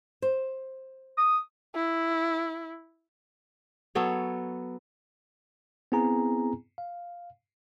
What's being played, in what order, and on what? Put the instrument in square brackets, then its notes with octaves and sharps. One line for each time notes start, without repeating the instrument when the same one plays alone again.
[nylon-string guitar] C5
[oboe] D#6
[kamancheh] E4
[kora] F#3 B3 A4 C#5
[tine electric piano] B3 C4 E4 G#4 G#5 A#5
F5